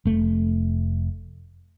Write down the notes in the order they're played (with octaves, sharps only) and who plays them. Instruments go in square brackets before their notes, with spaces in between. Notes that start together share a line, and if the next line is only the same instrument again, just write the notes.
[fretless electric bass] F1 A3